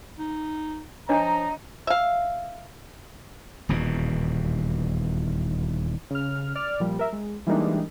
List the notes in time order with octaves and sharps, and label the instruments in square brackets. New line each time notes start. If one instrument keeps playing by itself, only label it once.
[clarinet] D#4
[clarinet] F3 [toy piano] D4 C#5 D#5 [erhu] D#4 [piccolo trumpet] A#5
[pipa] E5 F5
[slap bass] D#1 E2 B2
[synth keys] C#3 F6
D5 F6
A#2 F3 G3
A#4 E5
G#3
E3 G3 G#3 A#3 D4 D#4